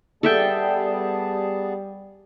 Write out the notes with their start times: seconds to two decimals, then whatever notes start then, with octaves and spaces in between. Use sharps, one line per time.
0.23 G3 B3 G#4 A4 E5 G5 A5